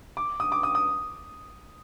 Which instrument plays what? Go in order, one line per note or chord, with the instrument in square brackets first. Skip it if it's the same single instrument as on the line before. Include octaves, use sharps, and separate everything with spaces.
[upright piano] D6
D#6
D6
D#6
D#6